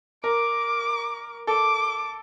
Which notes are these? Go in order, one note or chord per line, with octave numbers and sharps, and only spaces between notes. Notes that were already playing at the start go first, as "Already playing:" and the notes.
A#4 D6
A4 D6